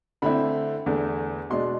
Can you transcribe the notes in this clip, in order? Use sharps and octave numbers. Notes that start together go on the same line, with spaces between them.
D3 A3 C4 E4 B5
E2 D3 A3
B2 G#3 D4 C6